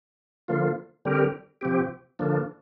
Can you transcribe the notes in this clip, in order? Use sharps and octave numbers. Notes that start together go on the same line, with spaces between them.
D3 F3 A#3 F4
D3 G3 C4 G4 A#4
C3 F3 C4 G4
D3 F3 A#3 D4